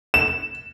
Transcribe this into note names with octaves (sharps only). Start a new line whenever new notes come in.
E7